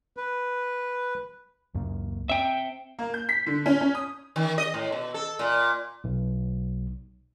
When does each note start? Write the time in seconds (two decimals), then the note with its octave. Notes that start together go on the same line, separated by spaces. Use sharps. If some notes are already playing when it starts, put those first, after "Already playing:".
0.17 B4
1.74 C#2 F#2 A#3
2.29 C4 E5 G5
2.99 A#3
3.14 G6
3.29 B6
3.46 D3
3.66 C#4
3.81 C#4
3.95 D#6
4.36 D#3
4.58 D#5
4.74 A2
4.92 B2
5.14 A4
5.39 A#2
6.04 B1